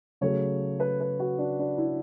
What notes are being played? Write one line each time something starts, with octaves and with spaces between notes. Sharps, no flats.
C#3 F#3 A3 C#5
B4
B4
F#4
D4
D4
E4